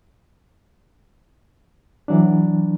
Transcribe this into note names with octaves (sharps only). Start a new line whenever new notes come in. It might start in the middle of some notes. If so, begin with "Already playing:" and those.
E3 F#3 D4